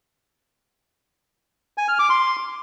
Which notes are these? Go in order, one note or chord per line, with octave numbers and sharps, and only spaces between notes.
G#5
F6
D6
C6